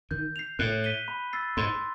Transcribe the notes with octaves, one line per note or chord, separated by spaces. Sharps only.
D#3 G6
C7 F7
A2 F#6
B6 D#7 G7
B5
E6 A6 C7
G#2 C6